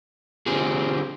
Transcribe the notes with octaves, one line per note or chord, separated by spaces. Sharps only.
D3 C4 F4 G4 G#4